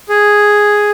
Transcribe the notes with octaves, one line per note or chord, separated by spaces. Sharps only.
G#4